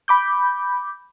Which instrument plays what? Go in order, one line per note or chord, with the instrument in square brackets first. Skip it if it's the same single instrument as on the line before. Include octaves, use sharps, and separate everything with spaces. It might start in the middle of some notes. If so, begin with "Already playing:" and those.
[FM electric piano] B5 D6 G6